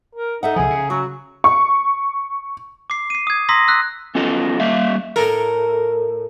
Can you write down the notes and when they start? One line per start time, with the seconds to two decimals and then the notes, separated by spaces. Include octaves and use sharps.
0.15 A#4
0.43 D#4 A4 E5 F#5
0.56 C2 F3 G#4
0.70 C#3
0.90 F#3 F#4
1.44 C#6
2.90 D6 C7
3.10 C7 D#7
3.27 D#6 G#6
3.49 A#5 C6 D#6 E6 A#6 B6
3.68 E6 F#6 B6
4.15 B3 C#4 F4 A4 D#5
4.60 G3 A#3 E5 F5
5.16 A2 A4 A#4